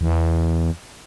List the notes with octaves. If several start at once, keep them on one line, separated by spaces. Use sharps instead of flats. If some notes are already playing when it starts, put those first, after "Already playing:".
E2